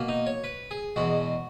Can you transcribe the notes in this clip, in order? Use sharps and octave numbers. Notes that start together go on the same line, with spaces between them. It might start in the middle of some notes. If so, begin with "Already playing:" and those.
Already playing: B2 A#3
D#4
C#5
B4
G#4
E2 B2 G#3 F#4